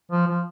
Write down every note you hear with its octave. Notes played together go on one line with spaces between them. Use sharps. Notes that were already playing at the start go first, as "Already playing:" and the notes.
F3
F3